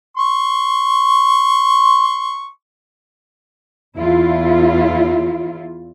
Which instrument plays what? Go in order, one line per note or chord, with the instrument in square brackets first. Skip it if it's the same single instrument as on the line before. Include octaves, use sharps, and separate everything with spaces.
[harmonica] C6 C#6
[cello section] E2 E4 F4